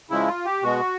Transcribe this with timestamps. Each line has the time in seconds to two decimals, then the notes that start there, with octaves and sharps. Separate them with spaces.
0.10 C#3 F3 G#3 E4
0.28 F4
0.45 G4
0.62 B2 G#3 F#4